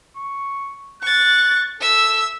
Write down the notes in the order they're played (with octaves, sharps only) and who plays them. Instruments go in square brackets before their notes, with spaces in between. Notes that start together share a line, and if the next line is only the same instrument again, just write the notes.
[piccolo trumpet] C#6
[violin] C#6 A6 [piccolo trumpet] F#6
[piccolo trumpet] A4 [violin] E5 E6